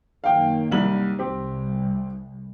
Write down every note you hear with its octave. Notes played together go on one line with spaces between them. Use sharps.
F#2 D#3 A#3 F5 G5
C2 G3 F#7
C2 C4 G4